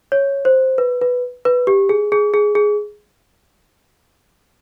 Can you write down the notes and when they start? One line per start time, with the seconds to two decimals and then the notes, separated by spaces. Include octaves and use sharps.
0.12 C#5
0.45 C5
0.78 B4
1.01 B4
1.45 B4
1.67 G4
1.89 G#4
2.12 G#4
2.34 G#4
2.55 G#4